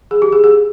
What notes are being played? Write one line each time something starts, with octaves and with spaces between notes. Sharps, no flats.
G#4
G4
G#4
G#4